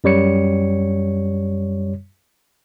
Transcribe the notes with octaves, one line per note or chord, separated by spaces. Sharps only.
F#2 G3 C#5 C#7